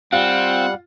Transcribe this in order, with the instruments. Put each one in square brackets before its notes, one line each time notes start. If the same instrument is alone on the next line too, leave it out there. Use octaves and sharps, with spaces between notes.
[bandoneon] G3 [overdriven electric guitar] C4 [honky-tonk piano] F4 [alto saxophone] F#5